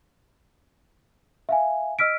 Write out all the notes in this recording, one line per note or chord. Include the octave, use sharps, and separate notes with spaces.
E5 F5 G#5
D#5 E6 F6 B6 D7